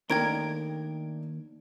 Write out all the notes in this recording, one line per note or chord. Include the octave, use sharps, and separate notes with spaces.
D#2 A3 D4 D#4 A#4 G5 G#6 D7